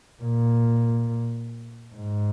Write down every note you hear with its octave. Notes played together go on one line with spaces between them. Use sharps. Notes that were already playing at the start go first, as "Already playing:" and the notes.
A#2
G#2